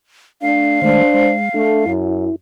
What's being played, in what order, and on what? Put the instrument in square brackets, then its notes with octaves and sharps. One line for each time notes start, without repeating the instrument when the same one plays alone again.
[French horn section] A3 D4 [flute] F5
[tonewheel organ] D#3 G#3 A3 [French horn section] D4 C5
[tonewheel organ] G#3
[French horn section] A3 [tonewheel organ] D4
[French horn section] F#2 [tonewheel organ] E4